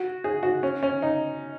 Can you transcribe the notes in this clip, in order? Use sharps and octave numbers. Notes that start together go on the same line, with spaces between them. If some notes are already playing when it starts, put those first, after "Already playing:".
Already playing: F#4
G#4
F#4
C#4
C#4
D#4